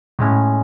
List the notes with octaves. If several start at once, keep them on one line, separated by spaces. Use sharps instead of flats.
A2 G#3 C#4